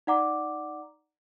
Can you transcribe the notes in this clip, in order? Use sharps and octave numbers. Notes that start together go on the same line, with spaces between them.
D#4 D5 F#5 A#5 D6